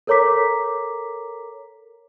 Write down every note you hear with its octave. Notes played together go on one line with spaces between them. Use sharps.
A4 A#4 C#5 A#5 D6 B6